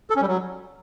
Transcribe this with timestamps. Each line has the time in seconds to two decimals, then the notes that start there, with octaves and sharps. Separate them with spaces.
0.10 A4
0.16 C#4
0.22 G3
0.27 F#3